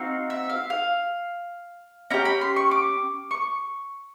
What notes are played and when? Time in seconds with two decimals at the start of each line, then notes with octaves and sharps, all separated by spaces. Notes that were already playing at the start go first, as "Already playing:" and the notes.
Already playing: C4 D#4 F#4 F5
0.30 E5
0.50 F5
0.70 F5
2.10 C#4 E4 G4 A#5
2.25 B5
2.41 C6
2.56 C#6
2.71 D6
3.31 C#6